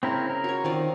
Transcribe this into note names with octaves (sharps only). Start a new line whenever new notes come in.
C#3 C4 E4 A#4
A#4
F#4 C#5
D#3 C4 F4 D5